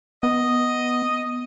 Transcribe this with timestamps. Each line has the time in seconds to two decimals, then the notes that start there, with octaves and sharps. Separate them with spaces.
0.23 B3 D#5